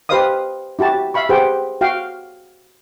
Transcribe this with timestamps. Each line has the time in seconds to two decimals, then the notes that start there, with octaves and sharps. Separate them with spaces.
0.09 G4 B4 C5 D#5 F5 D#6
0.79 E4 F#4 G4 A5
1.14 E5 F5 B5 C#6
1.29 G4 G#4 B4 C5 F#5 G5
1.81 F#4 F5 G5